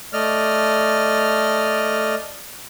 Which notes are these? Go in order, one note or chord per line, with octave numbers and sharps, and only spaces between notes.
A3 D5 D#5 F6